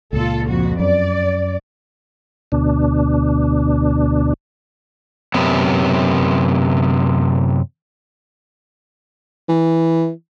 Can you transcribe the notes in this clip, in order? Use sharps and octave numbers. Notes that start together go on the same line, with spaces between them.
C#2 A#2 F4 A4
F2 F#4
F#2 D5
D2 B2 D4
F#2 C3 B3
E3